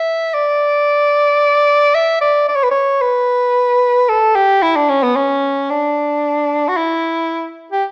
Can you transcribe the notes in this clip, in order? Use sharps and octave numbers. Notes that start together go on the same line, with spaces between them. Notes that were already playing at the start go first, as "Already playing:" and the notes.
Already playing: E5
D5
E5
D5
D5
C#5
B4
C#5
B4
A4
G4
E4
D4
C#4
B3
C#4
D4
F#4
E4
G4